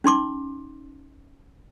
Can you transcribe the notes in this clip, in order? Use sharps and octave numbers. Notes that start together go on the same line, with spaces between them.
C#4 D#4 C6 D6